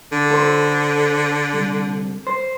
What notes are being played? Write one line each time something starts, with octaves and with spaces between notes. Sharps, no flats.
D3
A4 C5
C2
C5